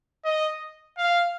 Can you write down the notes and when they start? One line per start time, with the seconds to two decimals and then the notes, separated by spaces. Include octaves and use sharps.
0.25 D#5
0.98 F5